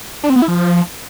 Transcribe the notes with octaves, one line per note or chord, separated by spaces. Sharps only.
D4
C4
B3
E4
F3